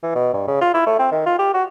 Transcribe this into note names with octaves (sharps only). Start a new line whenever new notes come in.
E3
B2
G2
C#3
F4
E4
A3
C4
D#3
F4
G4
F#4